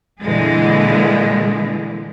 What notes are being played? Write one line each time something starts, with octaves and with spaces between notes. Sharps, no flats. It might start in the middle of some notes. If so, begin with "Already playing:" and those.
A#2 D3 E3 G#3 G#4